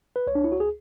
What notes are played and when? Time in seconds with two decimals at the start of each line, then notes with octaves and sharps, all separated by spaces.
0.16 B4
0.27 C#2 C#5
0.35 D4
0.44 E4
0.52 F#4
0.60 G#4